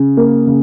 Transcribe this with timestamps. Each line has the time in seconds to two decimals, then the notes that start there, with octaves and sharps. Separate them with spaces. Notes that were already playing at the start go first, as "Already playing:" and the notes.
Already playing: C#3
0.17 A#3
0.47 C#3